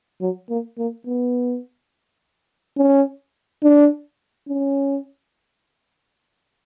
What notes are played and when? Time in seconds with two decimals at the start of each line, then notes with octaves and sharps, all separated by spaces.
0.21 F#3
0.50 A#3
0.78 A#3
1.07 B3
2.77 C#4
3.63 D4
4.49 C#4